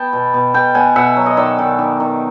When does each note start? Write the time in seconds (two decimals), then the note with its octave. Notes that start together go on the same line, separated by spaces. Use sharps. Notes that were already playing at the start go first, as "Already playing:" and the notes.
Already playing: B3 G5 A5
0.13 B2
0.34 B2
0.54 B2 G5 A5
0.75 B2 F#5 G#5
0.96 B2 E5 F#5
1.16 F#3
1.26 D#5
1.37 D#3 D5 E5
1.59 D#3
1.79 D#3
2.00 D#3